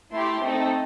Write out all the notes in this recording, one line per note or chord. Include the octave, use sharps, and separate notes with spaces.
A3 E4 G4 C6
A3 C4 D#4 A4